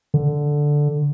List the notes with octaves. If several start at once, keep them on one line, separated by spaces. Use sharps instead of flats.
D3